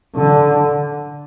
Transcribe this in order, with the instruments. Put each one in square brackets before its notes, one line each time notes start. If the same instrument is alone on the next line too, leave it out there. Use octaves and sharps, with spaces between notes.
[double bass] D3